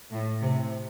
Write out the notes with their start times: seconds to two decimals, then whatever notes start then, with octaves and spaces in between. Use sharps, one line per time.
0.12 A2
0.42 C3